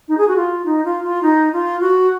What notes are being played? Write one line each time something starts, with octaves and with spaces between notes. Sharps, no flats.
D#4
G#4
F#4
F4
D#4
F4
F4
D#4
F4
F#4